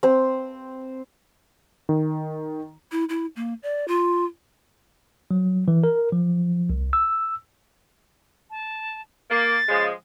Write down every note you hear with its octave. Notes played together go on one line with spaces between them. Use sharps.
C4 C5
D#3
E4
E4
A#3
D5
F4
F#3
E3
A#4
F3
C2
E6
A5
A#3 A6
C#3 F3 G#3